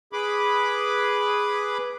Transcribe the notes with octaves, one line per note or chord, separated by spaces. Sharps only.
G#4 B4 B5 D6